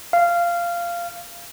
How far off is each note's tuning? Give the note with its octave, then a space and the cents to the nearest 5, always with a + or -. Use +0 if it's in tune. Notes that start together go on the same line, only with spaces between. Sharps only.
F5 -15